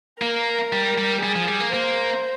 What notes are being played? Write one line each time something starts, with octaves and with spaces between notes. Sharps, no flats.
A#3 A#4
G3
G3
G3 G#4
F3
G3
A#3
A#3 C5